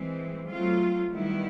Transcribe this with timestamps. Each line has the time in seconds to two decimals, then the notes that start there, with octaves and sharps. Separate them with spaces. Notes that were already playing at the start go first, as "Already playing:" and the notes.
Already playing: E3 G#3 C4
0.48 F#3 A3 C4 F4
1.10 D#3 G3 B3 E4